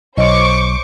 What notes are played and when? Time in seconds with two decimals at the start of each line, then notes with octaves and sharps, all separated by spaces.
0.18 B1 C5 C#5 D#5 C#6 D6